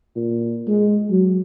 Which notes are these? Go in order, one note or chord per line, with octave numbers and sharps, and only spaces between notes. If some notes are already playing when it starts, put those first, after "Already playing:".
A#2
G#3
F#3